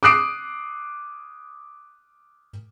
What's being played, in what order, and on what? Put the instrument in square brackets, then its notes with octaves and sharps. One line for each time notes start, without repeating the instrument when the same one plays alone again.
[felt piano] D6 D#6 F#6 C7 D7